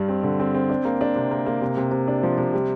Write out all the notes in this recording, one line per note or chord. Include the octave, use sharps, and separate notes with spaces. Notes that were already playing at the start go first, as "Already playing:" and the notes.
Already playing: G2 G3
C4
D3
C4
C4
D4
A#3
D4
C3
A#3
A#3
C3
C3
C3
D4
F3
C3
G3